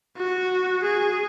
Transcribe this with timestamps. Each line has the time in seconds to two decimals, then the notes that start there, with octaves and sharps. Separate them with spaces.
0.17 F#4
0.83 G#4